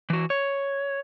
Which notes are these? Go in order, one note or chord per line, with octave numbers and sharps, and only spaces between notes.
E3 F#4
C#5